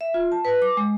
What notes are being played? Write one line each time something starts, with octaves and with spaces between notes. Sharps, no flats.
E5
F4
A5
B4
D6
G#3